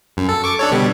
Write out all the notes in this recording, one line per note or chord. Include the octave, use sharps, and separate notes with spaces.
F#2
A4
C#6 D6
D4 A4 C#5
B2 D3 G3